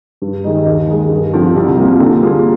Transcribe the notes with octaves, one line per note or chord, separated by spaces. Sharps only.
G2
D#3 G#3 D#4
D#2
D#3 G#3
G2
D3 F3 C4
C2
C3 G3 A#3 F4
D3
G3 A#3 F4 G#4